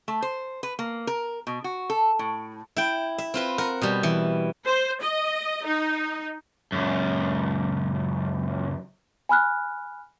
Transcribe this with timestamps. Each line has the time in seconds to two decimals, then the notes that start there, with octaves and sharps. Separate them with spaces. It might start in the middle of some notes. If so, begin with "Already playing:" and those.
0.08 A3
0.22 C5
0.63 B4
0.79 A#3
1.07 A#4
1.47 B2
1.64 F#4
1.90 A4
2.19 A2
2.76 E4 G5
3.18 E5
3.34 C4 F4 B4
3.58 A#4 F#5
3.82 B2 G3
4.03 E3
4.66 C5
5.02 D#5
5.66 D#4
6.72 C#2 F#2
9.29 G#5 B5 F6 F#6